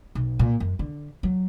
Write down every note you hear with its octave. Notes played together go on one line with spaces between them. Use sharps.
B1
A#2
F#2
D3
F#3